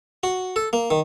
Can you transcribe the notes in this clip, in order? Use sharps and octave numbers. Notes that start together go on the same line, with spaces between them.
F#4
A4
A#3
D#3